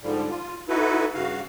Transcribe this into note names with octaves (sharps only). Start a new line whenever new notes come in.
G#2 D3 F3 G3
F4
D#4 E4 F#4 A4 B4
G2 C#3 F#4 F5